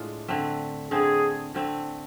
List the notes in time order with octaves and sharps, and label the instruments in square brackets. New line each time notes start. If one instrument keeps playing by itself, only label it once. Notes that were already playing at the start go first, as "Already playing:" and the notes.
Already playing: [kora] A2 G#3 D4 F4
D3 A3 C4
[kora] D3 A3 C4 [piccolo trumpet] G#4
[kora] D3 A3 C4